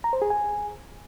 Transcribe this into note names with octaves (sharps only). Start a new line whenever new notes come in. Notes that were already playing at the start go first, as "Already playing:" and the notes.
A#5
C5
G#4
G#5